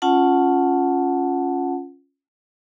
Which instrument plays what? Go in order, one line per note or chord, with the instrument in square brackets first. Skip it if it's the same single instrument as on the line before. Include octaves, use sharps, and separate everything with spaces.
[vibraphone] C#4 F4 F#5 A5